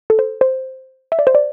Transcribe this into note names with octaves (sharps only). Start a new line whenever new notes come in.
A4
C5
C5
E5
D5
C5
D5